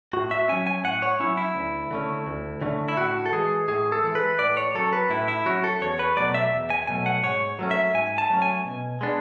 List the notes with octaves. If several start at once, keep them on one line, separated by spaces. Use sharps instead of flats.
A2 F#4
E5
F#3 C#4 G#5
G#5
A2 F#5
C#5
F#3 C#4 E4
E4
D2
D3 A3 C#4
D2
D3 A3 C#4
E4
A2 F#4
A4
E3 G#3 G#4
A2 G#4
A4
E3 G#3
B4
A2 D5
C#5
F#3 C#4 A4
B4
A2 E4
E4
F#3 C#4 F#4
A4
E2 C#5
B4
B2 F#3 A3 D5
E5
E2
G#5
B2 F#3 A3 G#5
F#5
G#2 C#5
F#3 A3 C#4
E5
G#2 G#5
A5
F#3 A3 C#4
G#5
B2
G#3 B3 D4